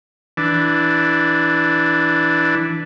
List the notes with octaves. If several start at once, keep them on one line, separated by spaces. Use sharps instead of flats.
E3 D4